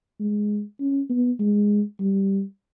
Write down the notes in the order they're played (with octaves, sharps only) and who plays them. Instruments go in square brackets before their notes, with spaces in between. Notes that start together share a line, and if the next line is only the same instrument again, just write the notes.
[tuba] G#3
C#4
B3
G#3
G3